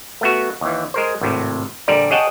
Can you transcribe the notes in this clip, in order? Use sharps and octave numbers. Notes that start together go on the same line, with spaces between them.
A3 B3 F#4
D#2 E3
G#3 A#4 C5
G#1 A2 C3
A#1 D3 G3 D5 A#5
G#4 C#5 D#5 F#5 G5 A5